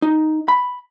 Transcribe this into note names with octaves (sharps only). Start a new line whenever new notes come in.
D#4
B5